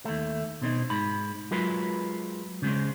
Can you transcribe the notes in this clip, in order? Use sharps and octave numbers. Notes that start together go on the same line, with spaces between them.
D#2 A3
B2 C4 D#4
G#2 B5
F#3 G#3 F4 A#4 B4
C#3 G#3 C4